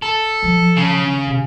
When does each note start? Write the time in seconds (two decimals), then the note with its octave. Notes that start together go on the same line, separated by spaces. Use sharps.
0.02 A4
0.42 F3 F#3
0.76 C#3
1.27 C3